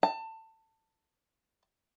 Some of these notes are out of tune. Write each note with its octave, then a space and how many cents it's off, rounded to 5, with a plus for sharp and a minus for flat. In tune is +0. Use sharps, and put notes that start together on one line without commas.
A5 +20